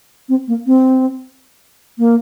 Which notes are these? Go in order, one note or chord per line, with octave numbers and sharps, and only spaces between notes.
C4
A#3
C4
A#3